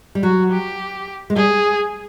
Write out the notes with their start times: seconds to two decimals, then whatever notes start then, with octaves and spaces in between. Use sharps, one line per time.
0.15 G3
0.23 F#3 F#4
0.51 G4
1.30 G#3
1.36 G3 G#4